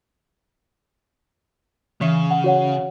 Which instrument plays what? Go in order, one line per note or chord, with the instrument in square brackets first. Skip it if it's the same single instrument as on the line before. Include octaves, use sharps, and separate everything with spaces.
[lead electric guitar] C#3 [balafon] E3 E5
[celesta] F#5
F#4 C#5 F#5